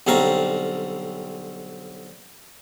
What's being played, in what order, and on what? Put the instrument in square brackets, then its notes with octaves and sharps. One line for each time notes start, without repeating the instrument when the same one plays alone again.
[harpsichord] B1 D3 G3 C4 F5 A#5